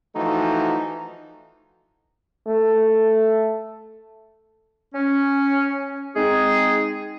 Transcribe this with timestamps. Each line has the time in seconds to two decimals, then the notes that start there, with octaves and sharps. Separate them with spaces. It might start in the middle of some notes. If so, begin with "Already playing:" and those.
0.15 E3 F3 A3 D#4 F#4
2.48 A3
4.94 C#4
6.15 G#3 C4 D#4 G#4